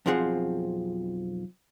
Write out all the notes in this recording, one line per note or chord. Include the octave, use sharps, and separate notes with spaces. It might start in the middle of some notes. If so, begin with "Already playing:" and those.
B1 F2 F3 C4 G#4 F#5